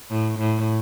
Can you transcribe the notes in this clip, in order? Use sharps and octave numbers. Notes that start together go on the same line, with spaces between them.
A2
A2